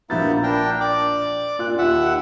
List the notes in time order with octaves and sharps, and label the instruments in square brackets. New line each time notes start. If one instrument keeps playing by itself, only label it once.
[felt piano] A#1 G6 A6 [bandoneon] A#3 B3 E4
[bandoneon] D4 A#4 G5
D5 D6
[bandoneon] A#2 [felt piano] F4 F#6
[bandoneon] D#2 E5 F#5